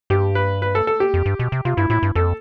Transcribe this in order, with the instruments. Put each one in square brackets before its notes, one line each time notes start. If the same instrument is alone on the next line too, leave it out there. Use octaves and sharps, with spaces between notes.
[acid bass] G2 [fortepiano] G4
[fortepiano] B4
B4
A4
A4
G4
[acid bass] F2
G2
B2
C3
[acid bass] C3 [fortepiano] F4
[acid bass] G2 [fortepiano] E4
[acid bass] A2 [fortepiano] E4
[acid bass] G2
[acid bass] F2 [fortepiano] A4